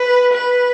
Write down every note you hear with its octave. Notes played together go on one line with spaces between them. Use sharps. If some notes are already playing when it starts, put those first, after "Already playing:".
Already playing: B4
B4